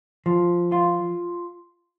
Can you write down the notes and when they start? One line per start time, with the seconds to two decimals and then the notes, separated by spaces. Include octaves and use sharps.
0.26 F3
0.72 F4